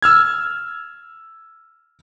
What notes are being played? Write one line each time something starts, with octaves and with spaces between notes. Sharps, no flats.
E6 F6 G#6